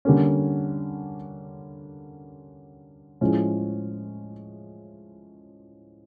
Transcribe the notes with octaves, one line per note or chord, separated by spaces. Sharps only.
D3 G3 A#3 C#4
A2 F3 G#3 C#4